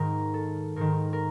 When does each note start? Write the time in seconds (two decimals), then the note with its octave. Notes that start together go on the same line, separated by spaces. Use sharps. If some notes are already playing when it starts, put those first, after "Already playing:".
Already playing: G#2 D#3 A#4
0.34 A4
0.76 G#2 D#3 A#4
1.13 A#4